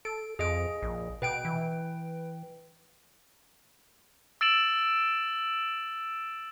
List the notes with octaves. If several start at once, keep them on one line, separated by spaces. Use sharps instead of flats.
A4 D7
F2 G#4 D#5 D7
A#1
B2 B4 G5 D7
E3
E6 A6 D7 E7 F#7